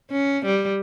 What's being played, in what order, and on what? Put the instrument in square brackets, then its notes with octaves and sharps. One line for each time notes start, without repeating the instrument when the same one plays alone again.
[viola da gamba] C#4
G3